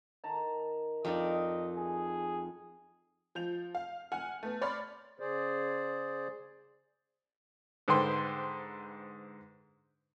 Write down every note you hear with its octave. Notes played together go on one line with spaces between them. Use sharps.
D#3 A5 A#5
F2 D#4 D5 D#5
G#4
F3 G6 F7
F5
F#5 G#5 F6
A3 B3
C#5 D5 B5 C6 F6
C#3 G#4 C5 D5
G#2 D3 B4 C5 G5 C6